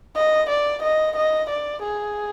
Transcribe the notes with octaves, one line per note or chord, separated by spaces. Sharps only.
D#5
D5
D#5
D#5
D5
G#4